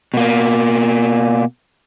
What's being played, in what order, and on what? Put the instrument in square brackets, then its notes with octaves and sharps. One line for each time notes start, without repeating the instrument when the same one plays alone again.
[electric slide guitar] B2 A#3